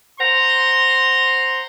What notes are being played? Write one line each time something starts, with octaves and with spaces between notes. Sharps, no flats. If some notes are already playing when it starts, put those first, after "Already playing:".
C5 F#5 A#5 C6